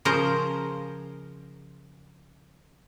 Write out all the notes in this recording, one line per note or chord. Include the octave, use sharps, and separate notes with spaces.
C#3 F3 G#4 A#4 C5 A#5